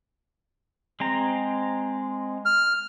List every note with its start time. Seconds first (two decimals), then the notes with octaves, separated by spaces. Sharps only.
1.00 G#3 C4 A#5
2.45 F6